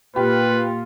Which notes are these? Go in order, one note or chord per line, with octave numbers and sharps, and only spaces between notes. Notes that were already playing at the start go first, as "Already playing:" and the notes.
A#2 F4 G4 B4